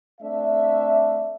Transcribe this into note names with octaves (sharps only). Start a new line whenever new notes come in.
A3 C4 D4 E5